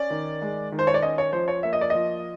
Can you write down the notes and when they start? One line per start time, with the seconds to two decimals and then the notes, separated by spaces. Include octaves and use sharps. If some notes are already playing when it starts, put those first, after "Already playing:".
Already playing: C#4 D5
0.10 D#3
0.41 G#3
0.72 D#3
0.79 C5
0.87 C#5
0.94 D5
1.02 C#4 D#5
1.18 C#5
1.33 F3 C5
1.48 C#5
1.63 A#3 E5
1.73 D#5
1.81 D5
1.90 F3 D#5